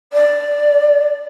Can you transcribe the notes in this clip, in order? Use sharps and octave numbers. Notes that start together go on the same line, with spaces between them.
D5